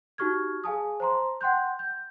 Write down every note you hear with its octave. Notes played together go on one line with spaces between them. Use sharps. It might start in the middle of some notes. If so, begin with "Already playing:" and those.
D#4 F#4 G4 C#6 F6 G#6
G#4 F5 G#5 A5 D#6
C5 A5 A#5 C6
F#5 G5 C6 F#6 G6
G6